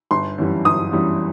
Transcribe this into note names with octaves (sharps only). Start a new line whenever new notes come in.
G1 C6
F#2 E3 G3
G1 D#6
F#2 E3 G3